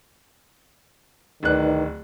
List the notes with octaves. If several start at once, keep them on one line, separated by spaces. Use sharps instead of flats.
D1 D#3 D#4 B4 D5 F#6